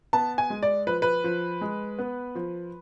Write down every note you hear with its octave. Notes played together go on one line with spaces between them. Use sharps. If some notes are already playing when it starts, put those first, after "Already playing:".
B3 A5
G#5
G#3
D5
F3 B4
B4
F3
G#3
B3
F3